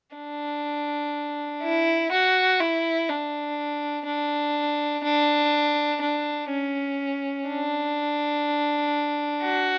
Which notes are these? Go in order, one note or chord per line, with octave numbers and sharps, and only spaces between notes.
D4
E4
F#4
E4
D4
D4
D4
D4
C#4
D4
F#4